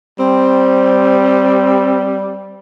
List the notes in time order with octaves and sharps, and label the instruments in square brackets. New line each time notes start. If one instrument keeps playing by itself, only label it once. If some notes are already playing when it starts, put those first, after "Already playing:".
[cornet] G3 [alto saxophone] C4